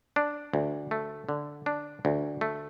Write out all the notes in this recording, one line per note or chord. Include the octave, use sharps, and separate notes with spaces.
D4
D2
A3
D3
D4
D2
A3